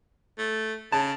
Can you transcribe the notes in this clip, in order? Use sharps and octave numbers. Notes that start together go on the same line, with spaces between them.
A3
C#3 A5